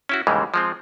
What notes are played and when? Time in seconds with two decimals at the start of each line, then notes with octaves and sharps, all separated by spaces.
0.09 C#4 E4 F#4
0.27 D#2 G#2 C#3 E3 G3 G#3
0.54 F3 G#3 C4